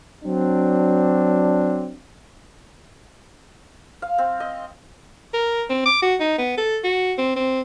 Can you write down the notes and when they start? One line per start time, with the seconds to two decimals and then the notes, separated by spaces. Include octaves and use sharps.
0.24 F#3 C4 D4
4.02 F5
4.18 C4
4.40 D#5
5.33 A#4
5.69 C4
5.85 D6
6.02 F#4
6.20 D#4
6.38 B3
6.57 A4
6.84 F#4
7.18 C4
7.36 C4